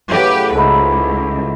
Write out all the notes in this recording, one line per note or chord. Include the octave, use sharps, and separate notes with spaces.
A2 C#3 F#3 G4 B4
C#2 G#2 D#4 E4 A4 B5